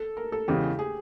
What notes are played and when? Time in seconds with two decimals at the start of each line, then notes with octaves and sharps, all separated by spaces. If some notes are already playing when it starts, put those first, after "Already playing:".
Already playing: A4
0.17 A#4
0.32 A4
0.48 E2 C#3 E3 G#3 G4
0.79 G#4